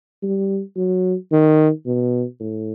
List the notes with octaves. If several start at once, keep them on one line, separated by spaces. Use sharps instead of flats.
G3
F#3
D#3
B2
A2